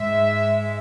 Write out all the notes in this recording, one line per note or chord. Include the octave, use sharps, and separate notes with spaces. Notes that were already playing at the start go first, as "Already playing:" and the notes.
Already playing: G#2 G#3 E5